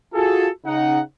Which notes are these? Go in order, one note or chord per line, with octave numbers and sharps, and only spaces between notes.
F4 F#4 G#4 A4
C#3 D#4 F#5